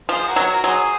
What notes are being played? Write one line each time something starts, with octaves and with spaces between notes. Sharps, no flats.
F3 G#4 C5
F#4 A#4
F#3
F#4 A#4
F#3 G#4 C5